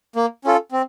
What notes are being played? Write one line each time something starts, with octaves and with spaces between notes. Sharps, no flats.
A#3
C#4 F4 A4
C4